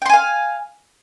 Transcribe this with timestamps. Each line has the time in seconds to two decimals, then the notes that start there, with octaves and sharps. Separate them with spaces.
0.02 G5
0.06 C6
0.09 G#5
0.13 F5